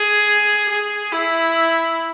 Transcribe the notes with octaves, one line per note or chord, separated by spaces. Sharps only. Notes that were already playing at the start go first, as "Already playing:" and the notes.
Already playing: G#4
G#4
E4